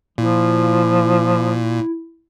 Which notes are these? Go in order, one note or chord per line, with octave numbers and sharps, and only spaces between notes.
A#2 F3 E4